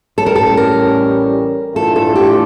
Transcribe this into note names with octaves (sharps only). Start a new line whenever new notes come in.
A1 A2 G3 C#4 A4
A#4
A4
A#4
A2 E3 A3 D4 F4 A4
A4
G4